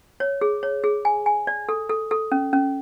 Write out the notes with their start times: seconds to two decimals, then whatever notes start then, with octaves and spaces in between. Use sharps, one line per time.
0.20 C#5
0.41 G#4
0.63 C#5
0.84 G#4
1.05 G#5
1.26 G#5
1.47 D5
1.69 A4
1.89 A4
2.11 A4
2.32 C#4
2.53 C#4